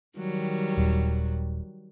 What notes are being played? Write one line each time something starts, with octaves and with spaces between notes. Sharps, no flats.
D#3 F#3 G3
D#1